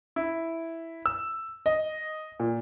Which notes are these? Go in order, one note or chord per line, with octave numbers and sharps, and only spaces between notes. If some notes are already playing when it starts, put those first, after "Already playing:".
E4
E6
D#5
A#2